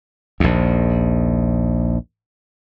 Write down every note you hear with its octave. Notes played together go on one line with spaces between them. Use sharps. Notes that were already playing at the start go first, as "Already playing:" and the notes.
A#1 D#2